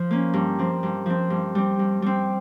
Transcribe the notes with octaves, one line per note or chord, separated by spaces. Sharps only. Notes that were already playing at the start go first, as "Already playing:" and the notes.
Already playing: F3
A#3 C#4
G2
F3 C4
G2
F3 C4
G2
G3 C4
G2
G3 C4